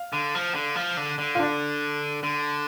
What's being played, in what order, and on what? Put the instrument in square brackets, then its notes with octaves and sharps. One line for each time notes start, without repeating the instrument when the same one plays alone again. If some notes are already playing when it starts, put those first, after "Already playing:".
Already playing: [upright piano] F5
[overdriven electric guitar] D3
F3
D3
F3
D3
D3
[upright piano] F4
D4
[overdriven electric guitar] D3